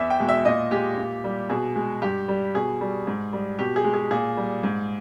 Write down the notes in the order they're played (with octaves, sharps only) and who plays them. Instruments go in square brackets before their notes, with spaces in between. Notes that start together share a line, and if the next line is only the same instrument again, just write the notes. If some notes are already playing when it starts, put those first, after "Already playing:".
Already playing: [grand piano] E2 E5
G5
B2 G#3
E5
A#2 D#5
G#3 G4
A#2
G3
B2 G#4
G#3
G2 G4
G3
B2 G#4
G3
G#2
G3
B2 G4
G#4
G#3
G#4
A#2 G#4
G3
G#2